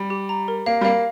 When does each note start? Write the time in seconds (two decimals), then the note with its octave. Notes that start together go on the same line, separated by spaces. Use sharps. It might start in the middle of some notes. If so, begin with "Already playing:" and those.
Already playing: G3
0.10 G4
0.29 A#5
0.48 A#4
0.66 A#3 F5
0.81 G3
0.85 A#3 F5